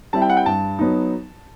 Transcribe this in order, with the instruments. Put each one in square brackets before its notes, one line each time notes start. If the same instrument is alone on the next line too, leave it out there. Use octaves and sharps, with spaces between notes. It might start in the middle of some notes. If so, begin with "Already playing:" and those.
[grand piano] G3 C4 E4 A5
G5
F#5
G5
G2 A5
F#3 B3 D#4